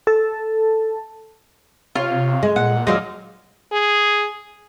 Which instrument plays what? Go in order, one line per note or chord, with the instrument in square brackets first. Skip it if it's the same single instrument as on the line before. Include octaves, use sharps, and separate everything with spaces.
[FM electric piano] A4 A5
[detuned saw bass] C3 [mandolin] F4 C#5
[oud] G#3
[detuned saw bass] A#2 [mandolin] F#5
[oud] D#2 F#3 G#3 [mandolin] D#4 D5 F5
[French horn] G#4